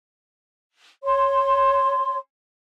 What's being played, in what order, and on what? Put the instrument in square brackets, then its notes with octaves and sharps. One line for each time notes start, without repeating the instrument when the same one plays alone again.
[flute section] C#5 C6